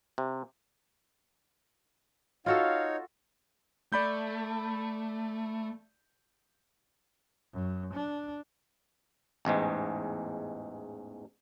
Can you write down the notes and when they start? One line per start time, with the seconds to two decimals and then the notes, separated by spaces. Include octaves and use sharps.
0.18 C3
2.46 D#4 F4 F#4 A4 C#5 F5
3.93 A3 D5 B5 G6
7.54 F#2
7.94 D4
9.45 A1 E2 G#2 G#3